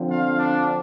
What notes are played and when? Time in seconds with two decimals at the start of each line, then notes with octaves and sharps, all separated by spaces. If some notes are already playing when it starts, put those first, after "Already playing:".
Already playing: D3 F3 C4
0.09 F4 F5
0.38 D4